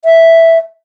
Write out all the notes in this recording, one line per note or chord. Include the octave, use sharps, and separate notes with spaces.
E5